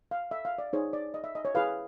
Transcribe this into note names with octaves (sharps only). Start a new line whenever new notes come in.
F5
E5
F5
D5
D#4 G#4 C5 C#5
D5
D#5
E5
D#5
C#5
E4 G#4 B4 F5